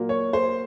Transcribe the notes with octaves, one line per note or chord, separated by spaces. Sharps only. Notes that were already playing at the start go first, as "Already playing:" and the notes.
Already playing: A#2 F#3 A#3
C#5
C5